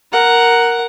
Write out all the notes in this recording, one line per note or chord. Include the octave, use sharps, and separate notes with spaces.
A#4 F#5